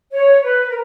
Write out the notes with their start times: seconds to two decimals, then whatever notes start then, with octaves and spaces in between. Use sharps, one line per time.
0.11 C#5
0.42 B4
0.69 A#4